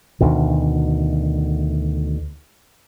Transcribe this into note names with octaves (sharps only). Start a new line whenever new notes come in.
D2 B2 D#3